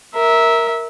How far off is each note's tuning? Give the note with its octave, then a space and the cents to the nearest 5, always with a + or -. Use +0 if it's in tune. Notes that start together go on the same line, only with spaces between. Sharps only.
A#4 +0 E5 -15